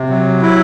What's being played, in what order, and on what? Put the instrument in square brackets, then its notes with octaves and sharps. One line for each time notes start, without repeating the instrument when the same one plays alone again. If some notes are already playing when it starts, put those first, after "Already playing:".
Already playing: [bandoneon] C3
F#3
E4